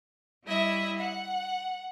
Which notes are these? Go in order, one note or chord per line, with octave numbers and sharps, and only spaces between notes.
G3 E4 D#5 E5
F#5